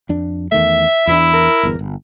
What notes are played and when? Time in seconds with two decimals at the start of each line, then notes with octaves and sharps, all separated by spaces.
0.09 F2 D4
0.52 E2 D#3 A3 E5
1.07 E2 E3 D4 E4
1.34 A#4
1.63 G1 E2
1.79 G1